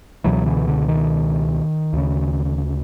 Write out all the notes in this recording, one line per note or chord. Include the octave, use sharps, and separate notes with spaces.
C#2 B2 E3 F#3
D3 E3
D3
D#3
D2 C#3